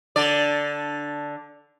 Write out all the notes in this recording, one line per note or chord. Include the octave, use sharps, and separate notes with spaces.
D3 D5